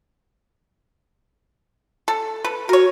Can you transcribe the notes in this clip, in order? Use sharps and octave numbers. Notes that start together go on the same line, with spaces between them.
A4
A4 B4
F#4 A#4 C#5